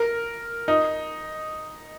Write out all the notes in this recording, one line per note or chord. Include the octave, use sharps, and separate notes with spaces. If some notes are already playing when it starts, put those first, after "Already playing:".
Already playing: A#4
D#4